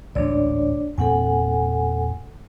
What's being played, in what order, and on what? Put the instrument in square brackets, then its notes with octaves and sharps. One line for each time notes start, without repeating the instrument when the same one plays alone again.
[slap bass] A1 D2 G#2 [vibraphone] D4 C#5 D5
[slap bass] E2 A#2 C4 [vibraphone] A4 F#5 G#5